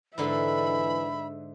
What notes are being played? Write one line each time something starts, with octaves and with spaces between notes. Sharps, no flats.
G#2 D3 E3 E5 B5